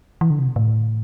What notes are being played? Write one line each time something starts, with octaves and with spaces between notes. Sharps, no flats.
E3
D3
C3
B2
A2